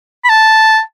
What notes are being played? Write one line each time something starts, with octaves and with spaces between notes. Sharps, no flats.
B5
A5